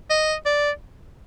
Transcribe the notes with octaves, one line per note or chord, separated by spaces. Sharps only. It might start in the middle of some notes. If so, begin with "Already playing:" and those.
D#5
D5